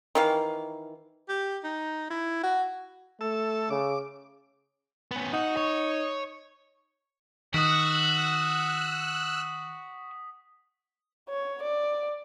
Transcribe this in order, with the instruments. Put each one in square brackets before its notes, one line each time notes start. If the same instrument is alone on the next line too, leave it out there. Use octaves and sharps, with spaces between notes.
[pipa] D#3 E3 F5
[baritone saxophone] G4
D#4
E4
F#4
[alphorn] A3 [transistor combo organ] A4 E6
[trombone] C#3 [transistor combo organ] D6
[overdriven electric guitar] B3 C#4
[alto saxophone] D#4 [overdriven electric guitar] F#4
[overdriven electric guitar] C#5
[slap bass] D#3 [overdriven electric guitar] F#4 [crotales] D#6 B6 [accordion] E6 F#6
[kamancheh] C#5
D5